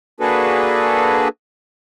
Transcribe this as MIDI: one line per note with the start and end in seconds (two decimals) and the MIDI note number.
0.20 1.28 58
0.20 1.28 62
0.20 1.28 66
0.20 1.28 68
0.20 1.28 69
0.20 1.28 71